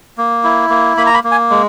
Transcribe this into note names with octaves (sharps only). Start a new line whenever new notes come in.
A#3
E4
A#3
A#3 B5
A#5
B5
A#3
G#5
G#3